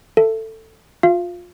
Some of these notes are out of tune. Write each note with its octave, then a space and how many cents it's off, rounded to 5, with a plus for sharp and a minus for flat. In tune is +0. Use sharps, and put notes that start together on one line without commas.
A4 +15 E5 +25
F4 +25 F5 -25